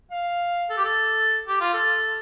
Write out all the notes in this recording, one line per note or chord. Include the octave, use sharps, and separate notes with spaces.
F5
A4
G4
A4
G4
F4
A4